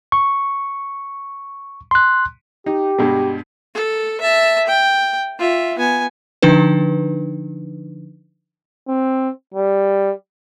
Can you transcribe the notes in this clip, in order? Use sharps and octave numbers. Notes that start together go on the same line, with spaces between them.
C#6
C6 F#6
D#4 G4
G2 B2 G#3
A4
E5 A5
G5
F4 E5
B3 G#5
D3 F3 D4 D#4 B4
C4
G3